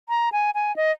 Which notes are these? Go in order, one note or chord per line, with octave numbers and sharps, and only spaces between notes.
A#5
G#5
G#5
D#5